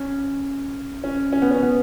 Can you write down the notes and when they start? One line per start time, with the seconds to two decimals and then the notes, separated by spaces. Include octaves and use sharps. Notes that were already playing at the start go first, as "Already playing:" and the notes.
Already playing: C#4
1.04 C#4
1.33 C#4
1.42 B3
1.51 C#4
1.62 B3